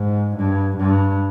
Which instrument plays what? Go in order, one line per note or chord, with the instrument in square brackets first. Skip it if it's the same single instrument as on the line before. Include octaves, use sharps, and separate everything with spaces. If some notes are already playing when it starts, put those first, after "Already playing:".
Already playing: [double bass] G#2
G2
G2